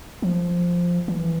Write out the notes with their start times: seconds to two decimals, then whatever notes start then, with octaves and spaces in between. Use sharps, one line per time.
0.22 F3
1.08 E3